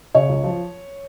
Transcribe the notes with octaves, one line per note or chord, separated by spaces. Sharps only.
C#3 C#5
C#2
F3